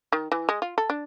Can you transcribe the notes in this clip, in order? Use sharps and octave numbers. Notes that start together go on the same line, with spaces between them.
D#3
E3
G#3
F4
A4
D4